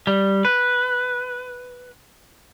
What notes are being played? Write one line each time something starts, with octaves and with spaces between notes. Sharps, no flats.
G3
B4